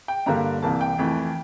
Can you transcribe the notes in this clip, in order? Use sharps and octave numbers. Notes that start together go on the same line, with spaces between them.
G5
G2 D3 G3 A#3 A#5
C2 C3 E3 A#3 A5
G5
F2 E3 A3